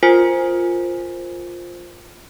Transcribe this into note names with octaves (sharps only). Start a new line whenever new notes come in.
F4 A#4 C5 G#5